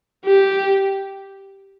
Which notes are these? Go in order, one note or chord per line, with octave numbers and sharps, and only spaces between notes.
G4